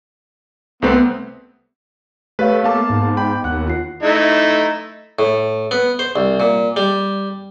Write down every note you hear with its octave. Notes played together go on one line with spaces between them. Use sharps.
C2 A3 B3 C4
A3 G4 B4 C#5 F5
A#3 B3 F5 A5 D6
G#2
G5 B5
D#2 F#5 F#6
F4 C7
A3 D#4 E4
A2
B3
C5
C2
A#2
G3